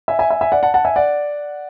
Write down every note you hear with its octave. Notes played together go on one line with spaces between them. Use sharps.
E5 G#5
E5 G#5
E5 G#5
E5 G#5
D5 F#5
F#5 A5
F#5 A5
E5 G#5
D5 F#5